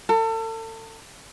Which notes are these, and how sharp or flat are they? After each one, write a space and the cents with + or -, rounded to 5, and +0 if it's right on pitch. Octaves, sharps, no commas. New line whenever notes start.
A4 +35